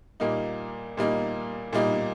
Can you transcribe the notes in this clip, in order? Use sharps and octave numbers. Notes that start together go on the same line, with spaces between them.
A#2 G3 A#3 D#4
A#2 G3 A#3 D#4
A#2 G3 A#3 D#4